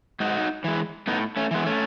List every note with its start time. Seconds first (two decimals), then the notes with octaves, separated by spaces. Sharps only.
0.20 G#2 D#4 F#4
0.64 E3 G#3
1.07 A2 B3 D#4
1.37 A3 C#4
1.51 E3 G#3 B3
1.66 A3 C#4